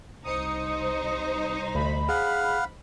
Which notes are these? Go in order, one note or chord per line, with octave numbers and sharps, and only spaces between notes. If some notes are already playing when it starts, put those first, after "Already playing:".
C2 D#4 C5 D#6 C#7
D2 B5
G#4 F5 F#5